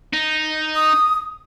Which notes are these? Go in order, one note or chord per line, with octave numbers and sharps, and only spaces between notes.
D#4
D#6